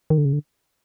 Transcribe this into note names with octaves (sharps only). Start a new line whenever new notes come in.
D#3
D3
C#3
D3